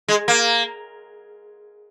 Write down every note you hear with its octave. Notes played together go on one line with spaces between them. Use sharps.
G#3
A#3